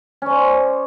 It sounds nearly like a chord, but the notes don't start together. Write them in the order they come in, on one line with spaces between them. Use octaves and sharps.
C#4 D5 C5